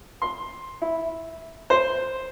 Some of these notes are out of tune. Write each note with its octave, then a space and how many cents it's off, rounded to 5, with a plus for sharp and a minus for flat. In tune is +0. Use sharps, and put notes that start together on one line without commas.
C6 +10
E4 -10
C5 +0